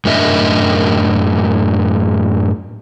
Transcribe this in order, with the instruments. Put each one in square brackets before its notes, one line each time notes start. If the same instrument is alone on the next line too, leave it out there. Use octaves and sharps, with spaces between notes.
[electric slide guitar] F#2 A2 D4 A#4 D#5 E5